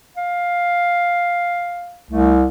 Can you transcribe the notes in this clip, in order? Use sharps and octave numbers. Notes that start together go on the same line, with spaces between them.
F5
C2 A3